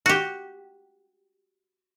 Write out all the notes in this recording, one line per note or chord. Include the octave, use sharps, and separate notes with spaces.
F#4 G4